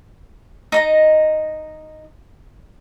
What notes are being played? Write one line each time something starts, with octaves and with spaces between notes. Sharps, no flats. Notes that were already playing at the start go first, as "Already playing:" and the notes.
D#4 D#5 A#5